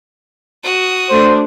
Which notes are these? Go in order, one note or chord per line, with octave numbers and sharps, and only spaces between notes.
F#4 D#6
A3 D4 C5